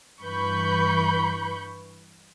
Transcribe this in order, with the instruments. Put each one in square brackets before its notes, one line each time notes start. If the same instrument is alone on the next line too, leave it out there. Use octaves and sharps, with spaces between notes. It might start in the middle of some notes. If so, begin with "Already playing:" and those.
[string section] G2 E3 B4 B5 C#6 G6